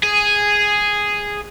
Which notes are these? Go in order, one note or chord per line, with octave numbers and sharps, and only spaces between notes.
G#4